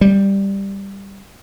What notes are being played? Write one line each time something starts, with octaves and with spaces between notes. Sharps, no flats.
G3